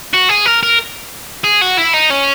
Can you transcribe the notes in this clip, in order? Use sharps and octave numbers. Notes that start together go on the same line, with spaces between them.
F#4
G#4
A#4
A#4
G#4
F#4
E4
D#4
C#4